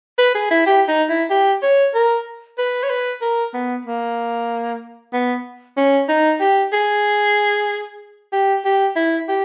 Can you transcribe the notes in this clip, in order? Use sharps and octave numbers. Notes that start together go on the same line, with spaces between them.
B4
G#4
E4
G4
D#4
E4
G4
C#5
A#4
B4
C#5
B4
A#4
B3
A#3
B3
C#4
D#4
G4
G#4
G4
G4
E4
G4